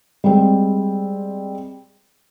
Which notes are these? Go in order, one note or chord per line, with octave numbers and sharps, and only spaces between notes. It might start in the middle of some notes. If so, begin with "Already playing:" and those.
G3 G#3 C4